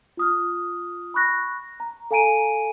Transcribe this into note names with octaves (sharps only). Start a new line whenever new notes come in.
F4 D#6 F6
B5 C#6 F#6 A#6
A#5
A4 F5 G#5 A#5 D7 D#7